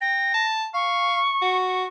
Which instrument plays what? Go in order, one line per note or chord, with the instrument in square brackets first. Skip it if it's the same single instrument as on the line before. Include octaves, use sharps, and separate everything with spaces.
[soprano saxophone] G5 [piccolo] A#6
[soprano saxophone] A5
[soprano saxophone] F5 [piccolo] C#6
[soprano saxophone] F#4